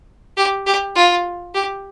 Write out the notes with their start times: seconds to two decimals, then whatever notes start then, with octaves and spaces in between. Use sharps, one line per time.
0.37 G4
0.66 G4
0.95 F4
1.55 G4